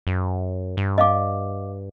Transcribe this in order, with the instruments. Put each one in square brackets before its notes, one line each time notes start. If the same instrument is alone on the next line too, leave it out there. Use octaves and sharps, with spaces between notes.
[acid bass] F#2
G2
[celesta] D#5 F5 D6